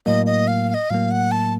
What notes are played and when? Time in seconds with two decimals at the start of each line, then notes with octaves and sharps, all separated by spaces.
0.06 A2 F#3 A#3 D#5
0.26 D#5
0.48 F5
0.69 F5
0.74 D#5
0.90 A2 F#3 A#3 F5
1.11 F#5
1.32 A5